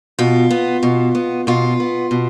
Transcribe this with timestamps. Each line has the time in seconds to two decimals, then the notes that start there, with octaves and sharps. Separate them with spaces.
0.19 B2 F4
0.51 B3
0.83 B2
1.15 B3
1.47 B2 F4
1.80 B3
2.11 B2